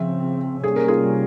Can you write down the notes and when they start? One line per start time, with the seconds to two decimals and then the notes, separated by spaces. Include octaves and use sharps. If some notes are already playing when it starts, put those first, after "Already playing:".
Already playing: C#3 F3 C4 E5
0.64 C3 G3 A#3 C#4 G#4
0.76 A#4
0.88 F4 G#4